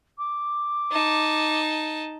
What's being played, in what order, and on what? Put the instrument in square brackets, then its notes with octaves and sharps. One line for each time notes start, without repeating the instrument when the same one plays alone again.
[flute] D6
[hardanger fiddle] D#4 A5